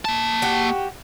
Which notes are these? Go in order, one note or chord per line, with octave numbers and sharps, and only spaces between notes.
A#3 A5
F#4 G4